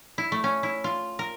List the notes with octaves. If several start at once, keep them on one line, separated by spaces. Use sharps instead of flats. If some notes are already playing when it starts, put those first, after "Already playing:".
E4
A3
C#4
E4
F4
A#4